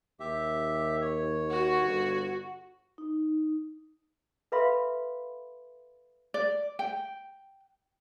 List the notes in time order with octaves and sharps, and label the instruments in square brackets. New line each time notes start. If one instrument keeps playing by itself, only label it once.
[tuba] D#2 [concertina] G4 E5
[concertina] C#5
[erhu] F#4
[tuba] G1
[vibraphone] D#4
[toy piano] A4 B4 E5 F5 B5 C6
[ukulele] D5
G5